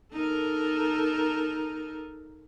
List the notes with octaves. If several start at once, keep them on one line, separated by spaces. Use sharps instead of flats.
D#4 A4 A#4